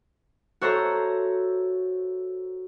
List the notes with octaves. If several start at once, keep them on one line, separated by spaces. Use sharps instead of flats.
F#4 A4 C5 C#5 E5 A#5